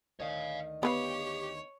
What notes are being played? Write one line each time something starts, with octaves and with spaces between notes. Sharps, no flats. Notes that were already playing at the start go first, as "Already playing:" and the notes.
D2 D#3 C#5 D#5 F5
B3 G4 B4 C#5 F5